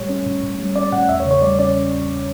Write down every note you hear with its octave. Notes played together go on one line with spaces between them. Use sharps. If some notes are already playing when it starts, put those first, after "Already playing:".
Already playing: A2 G3 C#5
C#4
A2
A2
G3
C#4 D5
A2 F#5
E2 E5
C#5
C#3
C#5
G3 D5
C#4 D5